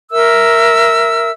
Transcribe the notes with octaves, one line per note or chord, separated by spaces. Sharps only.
A#4 E5 E6